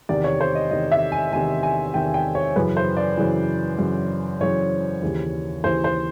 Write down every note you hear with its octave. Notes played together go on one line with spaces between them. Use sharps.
E2 C3 D#3 D5
C#5
C5
D#5
E2 C3 D#3 D#5
E5
G#5
E2 C3 D#3 G#5
G#5
E2 C3 D#3 G5
G5
C#5
F#2 C#3 E3 B4
C5
D5
F#2 C#3 E3
F#2 C#3 E3
F#2 C#3 E3 C#5
D#2 C#3 E3
D#2 C#3 E3 C5
C5